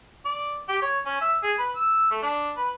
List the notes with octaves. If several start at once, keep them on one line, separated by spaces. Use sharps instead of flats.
D5
G4
C#5
C#4
E5
G#4
B4
E6
A3
D4
B4